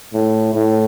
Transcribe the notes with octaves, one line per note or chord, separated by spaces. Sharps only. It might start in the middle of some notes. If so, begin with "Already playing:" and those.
A2
A2